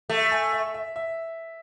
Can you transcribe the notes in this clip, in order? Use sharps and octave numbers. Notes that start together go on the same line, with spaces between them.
A3 E5
G#5
E5
E5
E5